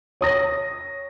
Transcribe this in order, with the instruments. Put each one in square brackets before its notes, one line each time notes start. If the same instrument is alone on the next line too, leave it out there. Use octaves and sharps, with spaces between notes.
[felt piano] C#5 D#6 A#6